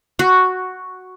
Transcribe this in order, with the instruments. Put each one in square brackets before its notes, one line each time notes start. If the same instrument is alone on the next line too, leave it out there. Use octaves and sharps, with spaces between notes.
[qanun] F#4